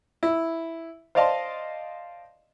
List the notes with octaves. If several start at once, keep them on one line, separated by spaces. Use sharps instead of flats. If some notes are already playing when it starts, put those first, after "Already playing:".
E4
C5 D5 D#5 F5 A5 C6